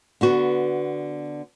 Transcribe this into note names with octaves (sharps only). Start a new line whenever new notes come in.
D3 B3 F#4